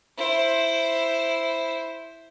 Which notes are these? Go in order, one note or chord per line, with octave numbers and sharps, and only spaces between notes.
E4 C5